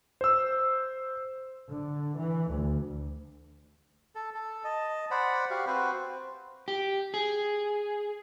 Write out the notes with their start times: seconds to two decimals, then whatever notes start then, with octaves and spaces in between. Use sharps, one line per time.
0.21 C5 E6
1.67 D3
2.16 E3
2.49 D2
4.15 A4
4.34 A4
4.64 D#5 A5
5.11 C5 D5 F#5 B5
5.50 F#4 G4 F5
5.67 C4 F#4 B4 C5
6.68 G4
7.14 G#4